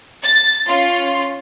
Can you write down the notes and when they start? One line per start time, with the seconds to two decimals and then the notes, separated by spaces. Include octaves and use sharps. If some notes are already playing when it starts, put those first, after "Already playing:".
0.24 A6
0.69 C#4 F4